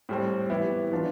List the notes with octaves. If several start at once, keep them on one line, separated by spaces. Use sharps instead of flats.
A2 G3 C4
E3 B3 E4 G4
E3 B3 D4 F4